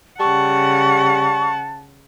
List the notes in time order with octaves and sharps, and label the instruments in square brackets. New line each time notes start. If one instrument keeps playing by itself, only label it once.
[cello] C#3 F#5 [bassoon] G3 [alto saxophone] A5 [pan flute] C#6